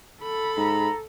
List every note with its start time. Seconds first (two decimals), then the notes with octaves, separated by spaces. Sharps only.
0.23 A4 B5
0.57 G#2 A#5